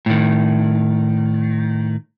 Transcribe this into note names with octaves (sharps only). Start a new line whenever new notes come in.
A2 D#3